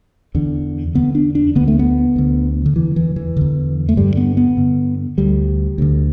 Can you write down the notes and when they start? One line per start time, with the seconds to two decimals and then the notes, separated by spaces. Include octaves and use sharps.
0.35 E2 D3
0.95 E2 D3 B3
1.15 D4
1.35 D4
1.55 D2 D3 B3
1.68 A3
1.79 B3
2.16 D2 D3
2.66 D3
2.76 E2 D3 E3
2.96 E3
3.16 E3
3.37 E2 D3
3.89 A3
3.97 G2 D3 G3
4.17 B3
4.37 B3
4.57 G2 D3
5.18 D2 D3 G3
5.78 D2 D3